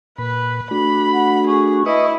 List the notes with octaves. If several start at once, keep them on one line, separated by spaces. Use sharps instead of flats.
A#2 B4 B5
A3 D4 F#4 B5
F#5
G#4 C#6
E4 B4 D#5 C#6 D#6